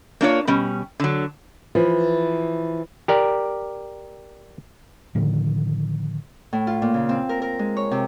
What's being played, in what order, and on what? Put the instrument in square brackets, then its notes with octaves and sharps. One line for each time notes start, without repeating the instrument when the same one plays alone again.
[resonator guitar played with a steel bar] A#3 D4 F4 C#5
B2 G3 C#4
D3 F#3
[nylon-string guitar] E3 [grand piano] F3
[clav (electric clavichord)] G4 A#4 D5
[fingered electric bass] A2 D3 D#3 F3
[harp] A2
F4
A#2
C#3
C4
A#4
A#4
G#3
C#5
C3